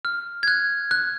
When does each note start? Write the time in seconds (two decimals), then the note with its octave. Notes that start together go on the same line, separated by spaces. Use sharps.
0.05 F6
0.43 G#6
0.48 F#6
0.91 F#6